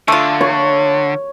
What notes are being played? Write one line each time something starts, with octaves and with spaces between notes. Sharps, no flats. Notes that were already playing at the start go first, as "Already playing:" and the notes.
D3 A3 F4
C#5